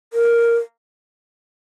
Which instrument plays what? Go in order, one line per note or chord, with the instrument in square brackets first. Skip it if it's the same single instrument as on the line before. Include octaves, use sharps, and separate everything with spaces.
[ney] A#4